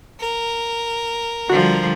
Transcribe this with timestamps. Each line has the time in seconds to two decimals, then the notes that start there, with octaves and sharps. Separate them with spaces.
0.20 A#4
1.50 D3 F3 G3 F#4